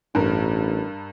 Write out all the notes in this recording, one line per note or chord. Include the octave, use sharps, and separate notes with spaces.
A1 G2 A#4